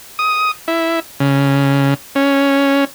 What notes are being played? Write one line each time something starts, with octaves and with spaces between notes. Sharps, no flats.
D#6
E4
C#3
C#4